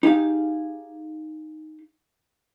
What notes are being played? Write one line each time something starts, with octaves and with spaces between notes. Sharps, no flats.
D#4 G4 G#4 F5